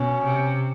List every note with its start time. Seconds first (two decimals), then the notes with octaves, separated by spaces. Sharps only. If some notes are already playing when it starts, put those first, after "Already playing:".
Already playing: B2 C#4
0.24 C3